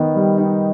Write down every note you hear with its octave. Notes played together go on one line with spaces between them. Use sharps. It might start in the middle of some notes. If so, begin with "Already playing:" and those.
Already playing: D#3 B3
G3
D#4